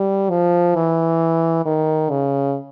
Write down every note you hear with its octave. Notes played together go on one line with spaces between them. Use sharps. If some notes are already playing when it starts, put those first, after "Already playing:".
Already playing: G3
F3
E3
D#3
C#3